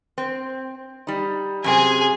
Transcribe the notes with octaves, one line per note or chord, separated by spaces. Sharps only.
C4
G3 D#4
F#2 C3 C4 G#4 G#5